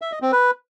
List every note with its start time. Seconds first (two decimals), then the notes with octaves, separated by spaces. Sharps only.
0.02 E5
0.12 D#5
0.22 C4
0.32 B4